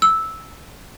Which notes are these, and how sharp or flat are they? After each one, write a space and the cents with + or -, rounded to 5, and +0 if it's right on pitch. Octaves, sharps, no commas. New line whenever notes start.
E6 -10